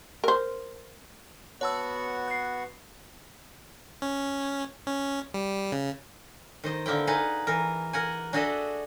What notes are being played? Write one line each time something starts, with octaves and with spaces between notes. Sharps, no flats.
A#4 C5
B3 F#4 C#5 F#5 A5 E6
F#6 C7
C#4
C#4
G3
C#3
D#3 C5 D#5
D3 A#3 E4 G5
D#4 G#4 B4 F5 F#5
E3 A#4
A#4 F#5 G#5
D4 F#4 G#4 A4 D#5 E5